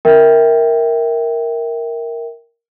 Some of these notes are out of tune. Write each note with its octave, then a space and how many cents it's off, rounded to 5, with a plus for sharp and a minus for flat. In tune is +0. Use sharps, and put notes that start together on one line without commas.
A#4 +0 E5 -10 G5 +0